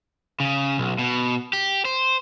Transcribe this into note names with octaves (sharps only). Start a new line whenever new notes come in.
C#3
B1
B2
G4
C5